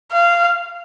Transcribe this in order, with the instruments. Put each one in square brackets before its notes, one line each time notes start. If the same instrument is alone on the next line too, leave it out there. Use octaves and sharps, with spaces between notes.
[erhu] F5